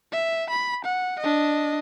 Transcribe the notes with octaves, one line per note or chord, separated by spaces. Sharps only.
E5
B5
F#5
D4 D#5